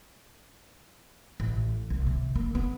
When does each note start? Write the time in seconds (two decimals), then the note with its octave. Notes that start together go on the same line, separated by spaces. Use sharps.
1.40 A1
1.90 C2
2.07 C3
2.36 A#3
2.55 B3